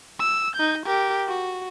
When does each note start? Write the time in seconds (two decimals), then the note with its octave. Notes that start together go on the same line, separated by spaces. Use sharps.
0.20 E6
0.56 D#4 G6
0.86 G4 A#4
1.28 F#4